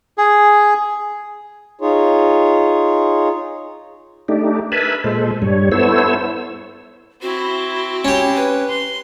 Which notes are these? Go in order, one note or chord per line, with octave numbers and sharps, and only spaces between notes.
G#4
D#4 F4 G#4 C#5
A3 D4 D#4 G4
A#4 B4 E5 G#5 A5 B5
A#2 G#3 A4 C5
G2 G3 C#5
B3 E4 A4 C5 C#5 E6
C4 E4 F#4
C#4 G4
B4
C6